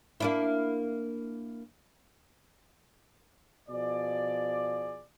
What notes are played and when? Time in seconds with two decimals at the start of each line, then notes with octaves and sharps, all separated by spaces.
0.20 A#3 D4 E4
3.68 B2 F3 G#4 D5